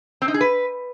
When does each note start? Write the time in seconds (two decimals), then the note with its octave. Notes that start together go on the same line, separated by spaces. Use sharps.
0.22 C4
0.28 D#4
0.34 G#4
0.41 B4